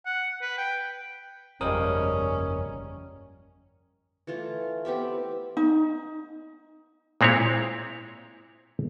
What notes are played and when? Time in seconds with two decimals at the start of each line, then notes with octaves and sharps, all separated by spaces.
0.06 F#5
0.42 B4
0.58 G5
1.61 G1 F2 F3 G3 G#3 C#4 A#4 D#6
4.27 E3 A3 F4
4.85 B3 C4 G4 E5
5.57 D#4
7.21 A#2 G#3 C4 E4 C#5